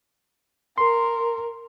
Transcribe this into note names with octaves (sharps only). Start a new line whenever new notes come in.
A#4 C6